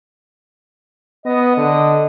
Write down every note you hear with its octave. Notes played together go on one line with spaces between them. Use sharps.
B3 D#5
D3